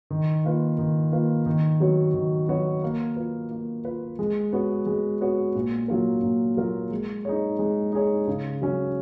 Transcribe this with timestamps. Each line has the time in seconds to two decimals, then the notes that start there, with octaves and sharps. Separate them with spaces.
0.10 D#3
0.44 A#3 F4 B4
0.78 D#3
1.12 A#3 F4 B4
1.46 D#3
1.80 F#3 B3 F#4 C#5
2.14 D#3
2.48 F#3 B3 F#4 C#5
2.83 A#3
3.16 F4 B4
3.51 A#3
3.85 F4 B4
4.19 G#3
4.53 B3 F#4 C#5
4.86 G#3
5.21 B3 F#4 C#5
5.55 A#2
5.88 F#3 A#3 F4 A#4
6.23 A#2
6.57 F#3 A#3 F4 A#4
6.90 G#3
7.25 D#4 G#4 C#5
7.59 G#3
7.92 D#4 G#4 C#5
8.27 C#3
8.62 F#3 C#4